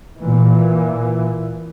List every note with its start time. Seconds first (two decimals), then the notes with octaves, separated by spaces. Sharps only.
0.20 A#2 E3